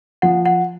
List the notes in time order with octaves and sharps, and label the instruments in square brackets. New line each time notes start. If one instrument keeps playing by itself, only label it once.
[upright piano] F3 [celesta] F#5
[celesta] F#5